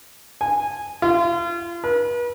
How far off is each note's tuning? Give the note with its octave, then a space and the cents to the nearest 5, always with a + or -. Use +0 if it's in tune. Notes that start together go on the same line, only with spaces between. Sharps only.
G#5 -15
F4 -35
B4 -40